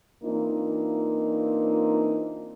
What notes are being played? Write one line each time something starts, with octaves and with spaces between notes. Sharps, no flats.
E3 A#3 C4 D4 D#4 F4